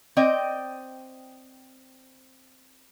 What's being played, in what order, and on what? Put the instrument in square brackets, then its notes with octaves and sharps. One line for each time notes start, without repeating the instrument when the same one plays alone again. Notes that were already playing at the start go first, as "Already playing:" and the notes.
[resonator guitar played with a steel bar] C4 D5 D#5 G5